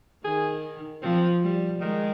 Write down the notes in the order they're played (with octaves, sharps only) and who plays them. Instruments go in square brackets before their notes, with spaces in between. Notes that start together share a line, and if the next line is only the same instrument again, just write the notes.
[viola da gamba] D#3 [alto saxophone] G#4
[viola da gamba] F3 [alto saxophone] C4
[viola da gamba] G3
[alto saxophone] D#3 [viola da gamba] G#3